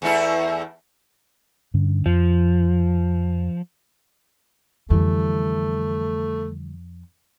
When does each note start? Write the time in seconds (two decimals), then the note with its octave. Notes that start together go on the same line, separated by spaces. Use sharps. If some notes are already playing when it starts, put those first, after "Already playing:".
0.02 E2 A3 E4
1.74 G2 D3 C#4
2.06 F2 F3
4.90 F2 D3 E3 G3 A3